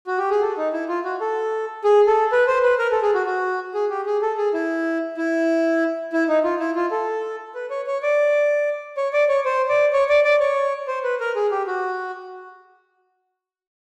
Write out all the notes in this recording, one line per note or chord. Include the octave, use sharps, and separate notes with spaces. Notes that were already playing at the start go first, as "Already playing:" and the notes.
F#4
G4
G#4
A4
D#4
E4
F4
F#4
A4
G#4
A4
B4
C5
B4
A#4
A4
G#4
F#4
F#4
G#4
G4
G#4
A4
G#4
E4
E4
E4
D#4
F4
E4
F4
A4
B4
C#5
C#5
D5
C#5
D5
C#5
C5
D5
C#5
D5
D5
C#5
C5
B4
A#4
G#4
G4
F#4